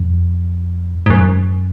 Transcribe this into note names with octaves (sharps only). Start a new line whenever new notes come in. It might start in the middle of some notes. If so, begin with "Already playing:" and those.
Already playing: F2
G#2
F#2